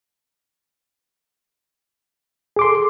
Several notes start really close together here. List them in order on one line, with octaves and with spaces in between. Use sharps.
G#4 D6 C6 A4